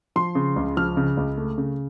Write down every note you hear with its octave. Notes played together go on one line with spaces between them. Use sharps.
F3 C6
C#3
C#2
F3 F6
C#3
C#2
A3
C#3